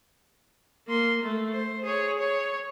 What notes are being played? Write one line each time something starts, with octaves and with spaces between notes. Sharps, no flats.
A#3 C6
A3
C5
G#4 C#5
C#5